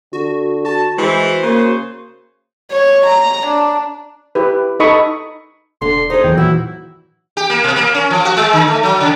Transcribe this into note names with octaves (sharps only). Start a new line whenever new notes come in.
D3 F#4
F#4 A5
E3 G#3 C5
C#3 A#3
C#5
A#5
D4
E4 G4 B4
D#4 A4 D#5 B5 C#6 D#6
E1 D3 C6
D#4 G#4 C5
E2 D#3 E3 F#3 G5
A#2 E4 F#4
G4
A#3
B2
A#3
C#4
F3
F#4
G#3
D3
A3
F#3
C#3